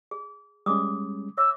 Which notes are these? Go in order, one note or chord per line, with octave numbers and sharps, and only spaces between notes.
G#4
G3 G#3 C#4 D6 D#6
C#5 E5 D6 E6